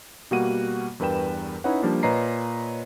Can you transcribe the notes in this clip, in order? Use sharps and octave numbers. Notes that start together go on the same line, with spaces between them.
B2 G3 A#3 F#4 F#5 D#7
E2 G2 A#4 B4 G5 E7
C#4 D#4 E4 B4 C#5 F#5
F3 G3 A#3 D4
A#2 B4 C#5 D#5 A#5 C7